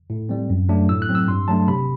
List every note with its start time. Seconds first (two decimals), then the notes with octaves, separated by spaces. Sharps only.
0.10 A2
0.29 G3 C4
0.50 F#2
0.69 F#3 A3 D4
0.89 A2 E6
1.02 F#6
1.09 F#3 C4
1.15 E6
1.28 G2 C6
1.48 F#3 A3 D4 A5
1.68 C3 B5